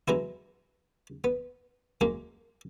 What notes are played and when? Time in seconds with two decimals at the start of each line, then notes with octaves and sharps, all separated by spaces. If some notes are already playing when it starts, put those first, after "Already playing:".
0.08 F#3 G#3 B3 E4
1.24 B3
2.01 F#2 G#3 A#3